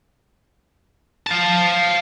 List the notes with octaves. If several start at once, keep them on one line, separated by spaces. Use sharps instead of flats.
F5 A5